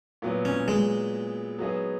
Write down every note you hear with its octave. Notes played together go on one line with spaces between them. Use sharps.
A#2 F#3 B3
C#4
G#3
F#3 B3 D#4 G#4